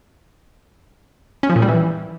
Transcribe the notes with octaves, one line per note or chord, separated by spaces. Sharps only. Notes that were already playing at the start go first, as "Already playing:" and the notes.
C#4
F3
A#2
G3
E3